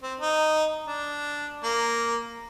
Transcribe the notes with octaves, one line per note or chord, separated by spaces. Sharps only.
C4
D#4
D4
A#3